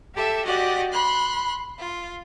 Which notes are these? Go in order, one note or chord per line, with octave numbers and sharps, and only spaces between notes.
G4 A4 E5
F#4 G4 D5 D#5 F#5
B5 C6 F#6
F4